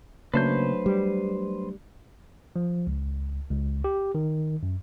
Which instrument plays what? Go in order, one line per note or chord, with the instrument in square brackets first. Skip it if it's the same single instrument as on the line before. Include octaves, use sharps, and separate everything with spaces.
[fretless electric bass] C#3 A#3 [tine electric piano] F#3 A3 D4 [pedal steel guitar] B4 C5 G6
[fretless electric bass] G3
[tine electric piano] F3
C#2
C#2
G4
D#3
F#2